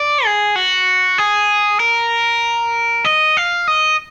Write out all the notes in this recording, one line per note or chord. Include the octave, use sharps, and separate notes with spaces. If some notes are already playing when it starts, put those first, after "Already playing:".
Already playing: D5
G#4
F#4
G#4
A#4
D#5
F5
D#5